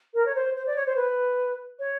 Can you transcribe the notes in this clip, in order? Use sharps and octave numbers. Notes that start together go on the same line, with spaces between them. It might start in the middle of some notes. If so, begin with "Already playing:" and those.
A#4
C#5
C5
C5
D5
C#5
C5
B4
C#5